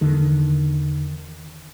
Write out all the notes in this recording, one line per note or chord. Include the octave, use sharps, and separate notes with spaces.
E2 D3 D#3